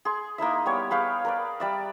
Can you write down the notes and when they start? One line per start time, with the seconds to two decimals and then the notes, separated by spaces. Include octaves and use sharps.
0.05 G#4 C6
0.38 A#3 D#4 E4 E5
0.66 G3 B3 G4 C#5
0.91 G#4 B4 F5 G5
1.25 A#4 B4 D5
1.60 G3 D5 E5